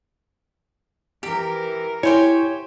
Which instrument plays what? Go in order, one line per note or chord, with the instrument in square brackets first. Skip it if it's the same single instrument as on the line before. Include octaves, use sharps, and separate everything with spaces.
[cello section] E3 A#4 [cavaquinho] G4
[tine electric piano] E4 [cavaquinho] G4 C5 G#5 [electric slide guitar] C#5